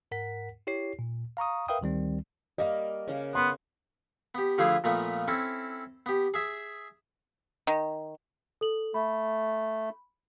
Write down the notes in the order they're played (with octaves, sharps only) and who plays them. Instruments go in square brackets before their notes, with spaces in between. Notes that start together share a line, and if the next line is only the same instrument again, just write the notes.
[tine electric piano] G#2 A#4 F#5 B6
E4 G4 C#5 C7
A#2
F5 A#5 C#6 D#6
A#4 B4 E5 F5 G5 D#6
D2 D#3 G3 C4
[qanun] G3 A#3 A#4 [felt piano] D#5
[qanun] C#3 A#3 A#4
[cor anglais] B3 [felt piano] C6
[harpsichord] B3 G4
D3 F3 A3 E4 F4 G#4
A#2 F3 A3 B3
C4 C#4 E4 A4
B3 G4
G#4 E5
[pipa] D#3
[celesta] A4 F#7
[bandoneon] A3 [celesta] B5